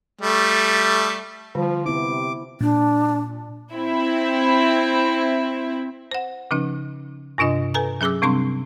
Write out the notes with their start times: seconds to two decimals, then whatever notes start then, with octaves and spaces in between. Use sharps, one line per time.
0.21 G3 A3
1.55 D3 F3 G3
1.86 C3 B3 E4 D6
2.61 A#2 D4
3.73 C4 E4
6.11 C5 F#5
6.51 C#3 F3 C#4 D#4
7.38 G2 C3 D4 F4 D#5
7.74 A4 B4 G#5 A#5
8.01 F#3 C#4 G#4 D6 E6
8.22 C3 G3 C4 D4 C6 C#6